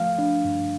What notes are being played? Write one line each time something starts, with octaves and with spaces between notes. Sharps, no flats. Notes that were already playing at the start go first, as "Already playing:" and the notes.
Already playing: F3 A3 F5
D4
G2